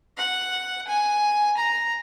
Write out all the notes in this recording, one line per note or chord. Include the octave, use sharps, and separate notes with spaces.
F#5
G#5
A#5